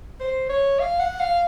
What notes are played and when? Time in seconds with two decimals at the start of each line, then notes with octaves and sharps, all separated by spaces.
0.20 C5
0.49 C#5
0.79 F5
1.00 F#5
1.20 F5